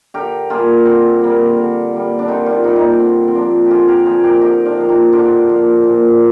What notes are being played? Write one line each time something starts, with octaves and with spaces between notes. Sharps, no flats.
D3 G4 A#4
G3 A#3 F4 G#4
D3 C4
G3 A#3
D3
G3 A#3
D4
D3 C4 D#4
D4 F4
G3 A#3 C4 D#4
D#4
D4
D3 C4
C4
F3 A#3 D4
G4
D3 F4 G#4
G4 A#4
F3 A#3 G#4 C5
G4 A#4
D3 D#4 G4
D4 F4
F3 A#3
C4 D#4
D3 D4 F4
F3 A#3
A#2